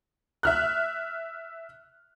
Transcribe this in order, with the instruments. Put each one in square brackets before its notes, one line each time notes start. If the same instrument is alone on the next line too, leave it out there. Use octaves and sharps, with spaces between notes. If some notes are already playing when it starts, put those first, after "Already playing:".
[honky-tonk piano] E5 F6 F#6